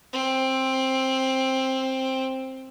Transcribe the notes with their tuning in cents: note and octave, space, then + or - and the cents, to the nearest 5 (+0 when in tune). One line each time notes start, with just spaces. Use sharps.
C4 +10